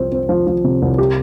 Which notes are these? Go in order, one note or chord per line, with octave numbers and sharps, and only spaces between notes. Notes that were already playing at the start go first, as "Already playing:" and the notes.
Already playing: C2 F3 C4
C4
F3
F3
C3
C2
G4